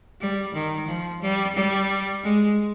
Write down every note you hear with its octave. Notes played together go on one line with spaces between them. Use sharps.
G3
D#3
F3
G3
G3
G#3